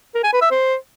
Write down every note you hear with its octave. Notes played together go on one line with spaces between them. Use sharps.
A#4
G#5
B4
E5
C5